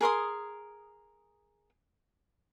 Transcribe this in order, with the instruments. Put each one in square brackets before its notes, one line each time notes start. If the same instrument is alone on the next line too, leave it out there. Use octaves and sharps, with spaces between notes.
[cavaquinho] G#4 A#4 C6 D#6